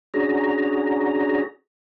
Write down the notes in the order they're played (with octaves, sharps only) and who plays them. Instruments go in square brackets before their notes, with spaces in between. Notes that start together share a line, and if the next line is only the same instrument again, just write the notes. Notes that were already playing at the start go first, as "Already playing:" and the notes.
[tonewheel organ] C#4 D4 F#4 G#4 A#5